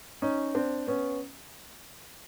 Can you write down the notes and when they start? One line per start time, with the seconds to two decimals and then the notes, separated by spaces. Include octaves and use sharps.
0.22 C#4 D#4
0.55 C4 D4
0.87 B3 C#4